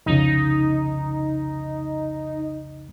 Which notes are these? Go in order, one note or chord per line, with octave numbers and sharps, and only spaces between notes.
C2 F2 C#3 D#4